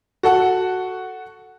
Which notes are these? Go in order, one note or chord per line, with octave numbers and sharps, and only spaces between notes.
F#4 A4 F#5